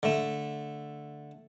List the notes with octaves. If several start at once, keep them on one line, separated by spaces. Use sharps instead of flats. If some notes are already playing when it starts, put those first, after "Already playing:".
D3 A3